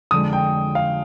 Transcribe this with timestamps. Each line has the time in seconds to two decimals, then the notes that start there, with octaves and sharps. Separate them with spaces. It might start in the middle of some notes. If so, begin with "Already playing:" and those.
0.11 F2 D3 G#3 D#6
0.33 G5
0.75 F5